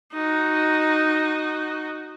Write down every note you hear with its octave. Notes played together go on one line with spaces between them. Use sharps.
D#4 F#4